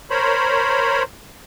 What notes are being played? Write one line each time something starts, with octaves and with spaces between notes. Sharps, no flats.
A#4 C5 C#5 B5